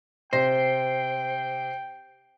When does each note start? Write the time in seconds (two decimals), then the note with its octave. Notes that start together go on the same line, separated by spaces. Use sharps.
0.33 C3 C5 G5 A#6